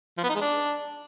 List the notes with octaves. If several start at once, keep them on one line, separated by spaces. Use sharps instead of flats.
F3
B3
D#4
G#3
D4